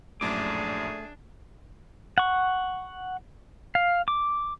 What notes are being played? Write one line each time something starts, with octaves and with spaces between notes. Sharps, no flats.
A#1 F#2 A2 A3 D4 G#4 D6
F#5 C#6
F5
D6